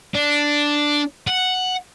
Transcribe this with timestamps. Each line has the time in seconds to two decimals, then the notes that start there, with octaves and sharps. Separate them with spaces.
0.15 D4
1.28 F#5